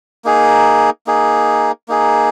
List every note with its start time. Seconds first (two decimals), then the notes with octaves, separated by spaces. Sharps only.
0.25 A#3 D#4 G#4
1.07 A#3 D#4 G#4
1.88 A#3 D#4 G#4